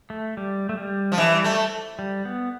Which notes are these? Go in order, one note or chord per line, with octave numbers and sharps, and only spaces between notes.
A3
G3
A3
G3
F3
E3 G3
A3
G3
B3